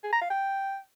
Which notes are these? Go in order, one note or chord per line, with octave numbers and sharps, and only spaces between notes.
G#4
A#5
F5
G5